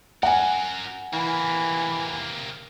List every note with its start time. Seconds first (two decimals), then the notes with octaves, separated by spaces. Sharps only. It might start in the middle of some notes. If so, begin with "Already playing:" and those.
0.23 F#4 A#4 F#5 G#5
1.13 C3 E3 A#3